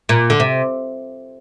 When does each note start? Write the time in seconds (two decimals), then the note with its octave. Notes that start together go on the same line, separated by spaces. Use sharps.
0.09 A#2
0.30 D3
0.40 C3